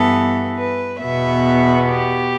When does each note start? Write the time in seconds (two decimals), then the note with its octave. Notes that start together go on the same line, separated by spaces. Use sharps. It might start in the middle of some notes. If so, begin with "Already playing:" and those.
Already playing: G2 E3 B3 A4
0.57 B4
1.01 E2 B2 B3 E5
1.88 G4